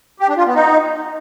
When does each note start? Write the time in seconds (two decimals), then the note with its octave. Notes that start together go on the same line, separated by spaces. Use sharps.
0.20 G4
0.29 D4
0.37 F4
0.46 B3
0.55 D#4